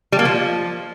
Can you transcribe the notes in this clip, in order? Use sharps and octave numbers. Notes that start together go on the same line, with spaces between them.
G3
A#3
F3